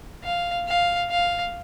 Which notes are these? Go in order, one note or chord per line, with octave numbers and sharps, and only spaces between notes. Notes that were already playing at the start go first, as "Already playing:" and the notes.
F5
F5
F5